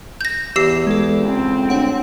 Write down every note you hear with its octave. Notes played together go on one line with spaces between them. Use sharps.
G6 A#6
E2 G4 E6 C7
G#3 A4
C#2 C4
D2 C#5 F#5 D7